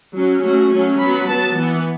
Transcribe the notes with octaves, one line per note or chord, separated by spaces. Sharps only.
F#3 C#4
F#3 A3 C#4 F#4
F#3 A3 C#4
F#3 B3 B5
F#3 B3 A5
E3 B3